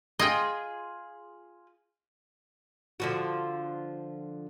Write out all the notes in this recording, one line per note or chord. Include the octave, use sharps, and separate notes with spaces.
F4 G#4 D#5 G5
D3 F3 F#4